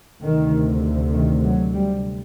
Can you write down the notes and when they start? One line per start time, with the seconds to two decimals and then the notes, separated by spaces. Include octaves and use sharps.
0.23 D2 C3 D#3
1.13 D#3
1.44 F#3
1.74 G3